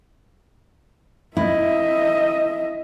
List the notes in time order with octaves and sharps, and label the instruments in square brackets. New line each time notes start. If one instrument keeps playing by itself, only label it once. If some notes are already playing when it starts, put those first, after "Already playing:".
[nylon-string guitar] E4 [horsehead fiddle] D#5 E5